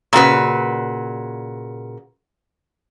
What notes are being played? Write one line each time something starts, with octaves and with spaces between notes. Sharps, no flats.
A#2 C#3 F#4 B4